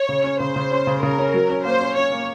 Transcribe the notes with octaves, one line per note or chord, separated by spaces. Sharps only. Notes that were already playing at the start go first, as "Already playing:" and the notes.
Already playing: C#5
C#3
C#4
C#3 C5
C#3
C#4
C#3
C#3 A#4
C#4
F#3
C#4
A#3 C5
C#4
C#4 C#5
A#3